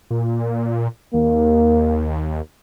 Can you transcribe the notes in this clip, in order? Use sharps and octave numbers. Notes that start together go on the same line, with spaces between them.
A#2
D#2 A#3